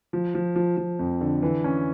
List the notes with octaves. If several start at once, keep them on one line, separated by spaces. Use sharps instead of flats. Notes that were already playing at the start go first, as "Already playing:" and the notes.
F3
F3
F3
F3
F2
D3
E3
C#4